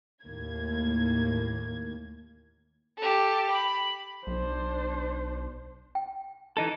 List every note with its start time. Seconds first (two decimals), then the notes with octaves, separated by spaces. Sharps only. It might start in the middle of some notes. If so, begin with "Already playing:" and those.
0.24 D#2 A2 A#3 G#6
2.98 G4 A4
3.51 B5
4.27 B1 D4 C5
5.95 G5
6.57 E3 D#4 A4